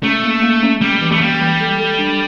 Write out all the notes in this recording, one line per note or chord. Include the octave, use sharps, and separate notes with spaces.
A3 C#4
A#3
A#3
C#4
G3 C#4
E3
A3
G3 A#3
E3
A4
A4
D4